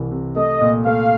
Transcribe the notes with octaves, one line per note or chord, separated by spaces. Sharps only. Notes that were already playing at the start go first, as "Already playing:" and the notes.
Already playing: C2 C3 E3
C3
A3 D#5
A#2
A3 F5